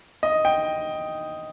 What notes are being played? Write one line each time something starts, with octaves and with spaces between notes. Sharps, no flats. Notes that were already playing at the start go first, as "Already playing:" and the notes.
D#5
G5